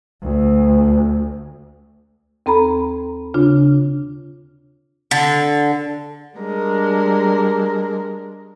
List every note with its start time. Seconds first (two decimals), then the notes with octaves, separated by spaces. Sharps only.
0.22 D2
2.46 D#2 C4 A4 A#5 B5
3.34 C#3 D4 F4
5.11 D3
6.37 G3 G#3 D4 A#4